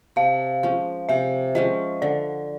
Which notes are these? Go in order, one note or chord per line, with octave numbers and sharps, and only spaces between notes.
C3 F5
F3 G#3 C#4
C3 E5
F3 G#3 C#4 D#5
D3 D5